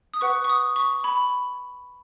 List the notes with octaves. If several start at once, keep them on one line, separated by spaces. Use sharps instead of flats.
D#6
B4 F#5 C#6
C#6
D#6
C#6
B5